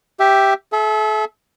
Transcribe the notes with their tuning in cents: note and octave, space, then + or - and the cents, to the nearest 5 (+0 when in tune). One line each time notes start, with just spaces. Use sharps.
G4 +0 E5 +0
A4 -40 E5 +0